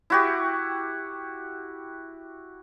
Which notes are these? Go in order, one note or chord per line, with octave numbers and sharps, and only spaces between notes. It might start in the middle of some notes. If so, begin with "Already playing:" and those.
E4 F#4 G4